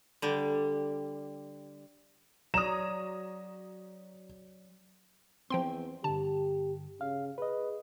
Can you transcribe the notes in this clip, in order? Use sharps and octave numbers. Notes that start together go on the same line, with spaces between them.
D3 G3
F#3 C#5 D5 A#5 D#6 E7
E2 F3 C4 G5 C6
G2 D3 G4 A5
C#3 F5
G#4 B4 D#5